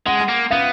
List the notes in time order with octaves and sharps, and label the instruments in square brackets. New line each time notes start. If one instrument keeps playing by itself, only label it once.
[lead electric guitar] G#3 [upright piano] F#5
[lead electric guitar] A#3
[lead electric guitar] B3 [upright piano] F5